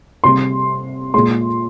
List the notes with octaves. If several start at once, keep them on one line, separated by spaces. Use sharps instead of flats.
C3 G3 C6
A#2 G#3 C6